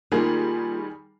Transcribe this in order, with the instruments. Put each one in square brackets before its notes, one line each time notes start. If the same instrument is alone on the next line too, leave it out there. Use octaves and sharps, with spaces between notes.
[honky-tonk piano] D#3 G3 G#4 [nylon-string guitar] A#3 F4